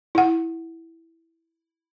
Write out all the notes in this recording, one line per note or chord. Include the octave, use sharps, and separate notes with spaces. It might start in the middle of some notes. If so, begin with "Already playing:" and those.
E4 F#5